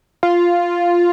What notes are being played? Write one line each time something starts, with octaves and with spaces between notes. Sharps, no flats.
F4